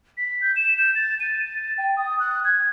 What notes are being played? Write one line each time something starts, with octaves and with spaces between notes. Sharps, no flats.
B6
G6
E7
G6
A6
D#7
A6
G5
D#6
F#6
G#6